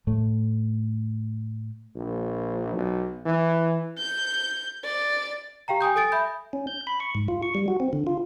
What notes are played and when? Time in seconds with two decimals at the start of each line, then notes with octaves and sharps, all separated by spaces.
0.07 A2 A3
1.96 A#1
2.74 B1
3.25 E3
3.98 G6
4.84 D5
5.68 G4 F5 G5 A#5
5.81 G5 G#5 D#6 G6
5.96 A4 G#5 D#6 A6 D7
6.12 E5 B5 G6
6.53 C#4
6.67 G6
6.87 B5
7.00 C#6
7.15 G#2
7.28 F4
7.43 C#6
7.55 G3
7.68 F#4
7.80 C4
7.93 D3
8.07 F4